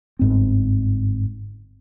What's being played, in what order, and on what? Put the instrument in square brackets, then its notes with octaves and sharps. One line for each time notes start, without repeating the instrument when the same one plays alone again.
[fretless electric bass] G1 G#2 C4